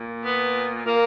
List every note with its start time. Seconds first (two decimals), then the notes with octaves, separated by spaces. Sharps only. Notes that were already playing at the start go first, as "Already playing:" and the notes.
Already playing: A#2
0.24 B3
0.86 A#2 A#3